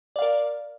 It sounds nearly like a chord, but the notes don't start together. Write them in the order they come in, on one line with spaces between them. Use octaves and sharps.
D5 F5 A#4